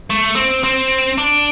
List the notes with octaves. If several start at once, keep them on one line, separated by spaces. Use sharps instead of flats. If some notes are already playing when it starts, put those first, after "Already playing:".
A3
C4
C4
D4